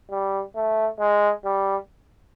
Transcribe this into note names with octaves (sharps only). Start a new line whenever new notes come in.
G3
A3
G#3
G3